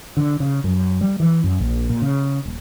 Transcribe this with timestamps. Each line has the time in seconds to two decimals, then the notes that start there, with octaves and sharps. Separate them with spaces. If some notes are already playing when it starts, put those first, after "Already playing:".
0.17 D3
0.40 C#3
0.64 F#2
1.01 G3
1.20 E3
1.44 F#2
1.60 A#1
1.89 A#2
2.02 C#3
2.45 D#1